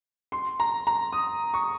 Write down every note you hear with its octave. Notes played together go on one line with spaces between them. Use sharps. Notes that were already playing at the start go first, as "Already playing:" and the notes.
C6
A#5
A#5
D#6
C#6